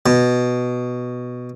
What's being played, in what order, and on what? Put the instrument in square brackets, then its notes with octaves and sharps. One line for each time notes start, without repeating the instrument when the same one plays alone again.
[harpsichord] B2